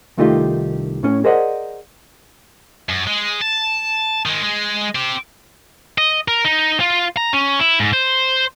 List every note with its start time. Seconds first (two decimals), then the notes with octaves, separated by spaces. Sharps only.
0.17 C2 D#3 A3 D#4 F4 G4
1.03 A2 C#4
1.24 G#4 A#4 C5 D5 D#5 F#5
2.89 F#2
3.07 G#3
3.41 A5
4.26 D#3 G#3
4.43 G#3
4.95 C4 G4
5.98 D#5
6.28 A#4
6.45 D#4
6.80 F4
7.17 A#5
7.33 C#4
7.59 E4
7.80 G#2
7.93 C5